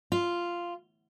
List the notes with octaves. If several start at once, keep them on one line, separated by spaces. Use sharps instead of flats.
F4